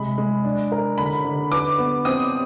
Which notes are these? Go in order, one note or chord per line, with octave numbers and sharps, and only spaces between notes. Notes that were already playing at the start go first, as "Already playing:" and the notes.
Already playing: C3 G#3 B5
G#3
D4
A#4
D3 B5
D3
B4 D6
B3
C4 D#6